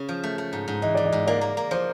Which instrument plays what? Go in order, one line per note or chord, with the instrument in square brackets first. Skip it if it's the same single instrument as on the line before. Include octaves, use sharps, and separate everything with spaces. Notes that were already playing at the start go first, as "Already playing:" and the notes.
Already playing: [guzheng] C#3 C#4
F3
A3
A3
G#2
G#2
[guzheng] E3 [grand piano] D#5
[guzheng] E3 [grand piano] D5
[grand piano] D#5
[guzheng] G#2
[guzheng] A#3 [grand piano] D5
[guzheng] A#3
A#3
[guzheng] F3 [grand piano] C5